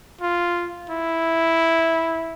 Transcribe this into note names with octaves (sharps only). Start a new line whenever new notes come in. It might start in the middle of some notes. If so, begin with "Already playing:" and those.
F4
E4